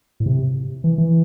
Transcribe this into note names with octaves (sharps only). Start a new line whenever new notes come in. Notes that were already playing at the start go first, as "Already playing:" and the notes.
A2
C3
E3
E3